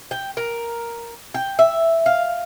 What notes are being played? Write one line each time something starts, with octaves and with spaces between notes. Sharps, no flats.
G5
A#4
G5
E5
F5